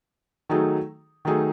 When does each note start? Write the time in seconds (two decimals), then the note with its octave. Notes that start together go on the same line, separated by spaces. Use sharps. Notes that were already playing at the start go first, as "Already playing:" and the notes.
0.49 D#3 F#3 A3 D#4 G#4
1.25 D#3 F#3 A3 D#4 G#4